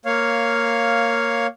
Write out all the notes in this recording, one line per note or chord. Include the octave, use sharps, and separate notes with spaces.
A#3 C#5 F5